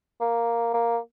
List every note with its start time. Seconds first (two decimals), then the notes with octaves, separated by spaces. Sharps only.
0.21 A#3
0.74 A#3